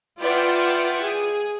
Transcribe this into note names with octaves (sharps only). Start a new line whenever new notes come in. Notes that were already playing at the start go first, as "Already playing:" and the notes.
F4 B4 D5 E5 F#5 G5
G#4